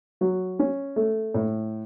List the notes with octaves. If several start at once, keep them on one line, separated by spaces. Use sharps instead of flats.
F#3
C#4
A3
A2